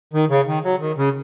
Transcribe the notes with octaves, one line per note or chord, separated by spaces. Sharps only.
D#3
C#3
D#3
F#3
D#3
C#3